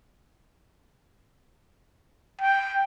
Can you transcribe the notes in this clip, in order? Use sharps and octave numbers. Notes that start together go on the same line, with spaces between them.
G5